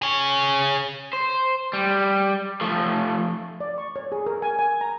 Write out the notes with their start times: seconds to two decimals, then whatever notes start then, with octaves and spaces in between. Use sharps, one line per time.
0.02 G#4 C#5
1.13 C5
1.73 G3
2.61 F3 A3
3.61 D5
3.78 C#6
3.96 C#5
4.12 G#4
4.26 A#4
4.42 G#5
4.59 G#5
4.81 A#5